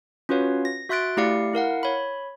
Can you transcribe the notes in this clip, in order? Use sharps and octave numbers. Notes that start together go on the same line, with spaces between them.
C#4 F4 F#4 B4 C#5 F5
A#6
F#4 E5 C6 F#6 A6 D7
A3 E4 G4 D5 F5 C#7
E4 A#4 F5 F#5
C#5 B5